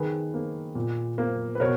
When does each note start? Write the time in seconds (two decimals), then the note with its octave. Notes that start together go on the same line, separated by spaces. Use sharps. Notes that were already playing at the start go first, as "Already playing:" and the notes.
Already playing: D#3 G#4 B4
0.34 A#3
0.75 A#2
1.18 A#3
1.55 B4
1.60 B2 A#4 C#5